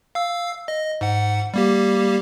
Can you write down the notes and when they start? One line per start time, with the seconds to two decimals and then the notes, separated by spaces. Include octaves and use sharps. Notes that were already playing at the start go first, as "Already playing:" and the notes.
0.15 F5 E6
0.68 D#5
1.01 G#2 F#5
1.54 G3 A#3 G4